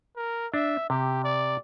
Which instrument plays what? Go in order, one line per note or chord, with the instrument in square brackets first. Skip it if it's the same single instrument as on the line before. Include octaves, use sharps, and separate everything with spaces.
[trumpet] A#4
[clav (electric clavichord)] D4 [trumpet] E5
[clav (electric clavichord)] C3 [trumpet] G4
[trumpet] D5